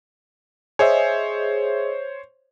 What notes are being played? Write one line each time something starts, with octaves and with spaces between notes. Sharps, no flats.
G#4 C5 C#5 D#5 E5